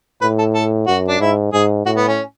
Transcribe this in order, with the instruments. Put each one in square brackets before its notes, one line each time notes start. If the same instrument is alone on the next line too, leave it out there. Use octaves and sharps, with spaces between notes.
[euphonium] A2 [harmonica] B4
[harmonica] A4
A4
[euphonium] F#2 [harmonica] F#4
[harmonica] D4
[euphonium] G#2 [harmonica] E4
[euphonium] G#2 [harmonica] G#4
[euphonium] A2 [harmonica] F#4
[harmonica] B3
C#4